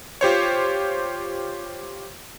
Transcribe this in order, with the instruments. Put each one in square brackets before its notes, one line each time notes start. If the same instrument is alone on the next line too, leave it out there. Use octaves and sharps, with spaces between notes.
[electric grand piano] F4 G4 C5 C#5